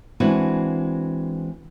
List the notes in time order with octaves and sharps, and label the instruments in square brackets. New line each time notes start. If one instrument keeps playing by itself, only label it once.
[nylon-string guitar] E3 G#3 C4 D4 F#4 B4